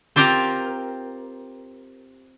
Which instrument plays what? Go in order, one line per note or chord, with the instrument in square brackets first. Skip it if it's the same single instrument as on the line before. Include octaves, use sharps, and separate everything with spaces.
[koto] C4 F4 G4 A#4